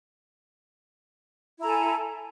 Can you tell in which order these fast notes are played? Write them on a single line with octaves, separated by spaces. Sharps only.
E4 A#5 A4 G#5